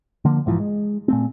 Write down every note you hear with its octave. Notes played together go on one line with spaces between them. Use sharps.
D3 F3 A#3
B1 G#2 E3 F3
G#3
A#2 A3 C4